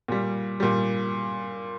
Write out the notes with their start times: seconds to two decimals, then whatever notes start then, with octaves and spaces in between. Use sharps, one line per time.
0.08 A#2 G3
0.60 A#2 G3